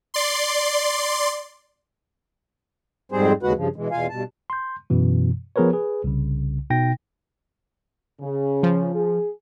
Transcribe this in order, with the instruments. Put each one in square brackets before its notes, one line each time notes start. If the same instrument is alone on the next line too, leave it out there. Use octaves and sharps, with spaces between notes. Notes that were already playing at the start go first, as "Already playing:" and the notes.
[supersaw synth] D5 C6
[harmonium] F2 G#2 G3 C4 G#4 C5
D#2 C#3 G#3 F#4 B4 F#5
G2 C#3 F3
B2 E3 G#3
E2 B2 F4 F5 G#5
G2 B2 A5
[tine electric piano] C6 G6
F#2 B2 E3
F3 B3 G#4 A#4 B4 C#5
G#4 B4
C2 C#3
B2 D#4 G5 A#6
[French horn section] C#3
[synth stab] F3
[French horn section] G#4